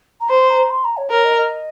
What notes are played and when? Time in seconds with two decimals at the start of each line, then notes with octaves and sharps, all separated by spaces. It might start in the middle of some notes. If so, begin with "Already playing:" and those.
0.21 A#5
0.30 C5 C6
0.50 A#5
0.70 C6
0.84 A#5
0.97 C#5
1.10 A#4 C#5
1.25 D#5
1.37 D#5